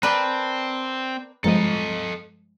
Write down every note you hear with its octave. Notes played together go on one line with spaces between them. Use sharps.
C4 A#4 B4 D5 A5
G2 F3 G#3 A4 D#5 A#5